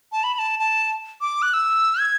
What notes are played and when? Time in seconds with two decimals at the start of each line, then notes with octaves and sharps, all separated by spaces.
0.12 A5
0.24 B5
0.34 B5
0.39 A5
0.59 A5
1.21 D6
1.42 F#6
1.54 E6
2.00 G#6